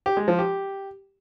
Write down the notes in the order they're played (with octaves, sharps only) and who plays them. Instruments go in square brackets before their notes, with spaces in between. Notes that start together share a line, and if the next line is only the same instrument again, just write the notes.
[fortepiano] G4
G#3
F3
G4